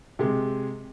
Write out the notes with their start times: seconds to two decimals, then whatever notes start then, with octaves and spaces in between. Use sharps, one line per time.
0.19 C3 G#3